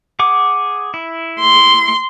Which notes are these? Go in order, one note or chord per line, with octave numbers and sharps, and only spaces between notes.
G#4 F#5 D6
E4
C6